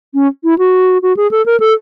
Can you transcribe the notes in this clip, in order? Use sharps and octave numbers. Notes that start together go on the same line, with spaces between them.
C#4
E4
F#4
F#4
G#4
A4
A#4
A4